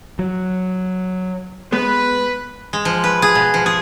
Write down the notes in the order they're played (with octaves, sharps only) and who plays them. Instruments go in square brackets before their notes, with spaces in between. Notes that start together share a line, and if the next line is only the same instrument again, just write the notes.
[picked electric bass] F#3
[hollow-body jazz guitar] G#3 B3 [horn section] B4
[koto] G#3
F3
B4
G#4
B2
F3
G#4